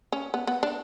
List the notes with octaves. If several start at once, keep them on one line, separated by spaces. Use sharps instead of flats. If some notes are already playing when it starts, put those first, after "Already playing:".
C#4
B3
B3
D4